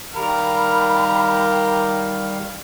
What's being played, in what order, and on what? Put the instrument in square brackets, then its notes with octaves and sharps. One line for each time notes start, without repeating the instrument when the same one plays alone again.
[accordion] D#3 G3 [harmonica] G4 A#4 [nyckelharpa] F5 [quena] B5